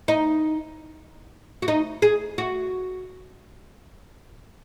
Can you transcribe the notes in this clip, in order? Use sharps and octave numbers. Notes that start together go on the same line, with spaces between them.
D#4
F#4
D#4
G#4
F#4